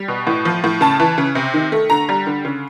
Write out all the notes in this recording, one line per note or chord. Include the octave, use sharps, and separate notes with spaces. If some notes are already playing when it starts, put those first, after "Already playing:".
Already playing: G3
B2
A2
F3
A2
C#3 A5
E3
C#3
C3
D#3
A3
D3 A#5
G3
D3
C#3